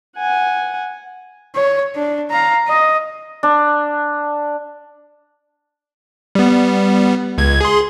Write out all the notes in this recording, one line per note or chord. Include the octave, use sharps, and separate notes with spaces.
F#5 G#5
C#5
D4
F5 A#5
D#5
D4
G3 B3
C#2 G#6
G#4 C6